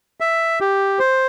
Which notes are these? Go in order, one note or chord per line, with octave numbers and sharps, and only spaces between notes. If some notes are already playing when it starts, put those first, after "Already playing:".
E5
G4
C5